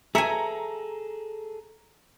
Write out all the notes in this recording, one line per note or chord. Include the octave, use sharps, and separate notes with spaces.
G#4 A4 E5 G#5 A#5 C#7